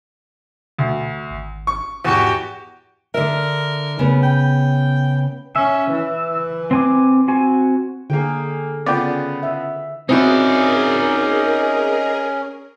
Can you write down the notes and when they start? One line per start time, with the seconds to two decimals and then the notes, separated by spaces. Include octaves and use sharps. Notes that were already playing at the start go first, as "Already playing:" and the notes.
0.78 D2 B2
1.31 G#1
1.67 C#6
2.05 E2 G#2 F#4 G4
3.14 D3 A#4 E5
3.99 C#3 B3
4.23 G5
5.56 C#4 E5
5.91 E3
6.71 C4 G#5 D6
7.28 C4 F#4 G#5
8.10 D3 A#3 G#4 G5
8.86 C#3 B3 F4 D5 G5
9.43 E5
10.09 C4 C#4 D#4 E4 F#4 G#4 A#4 D5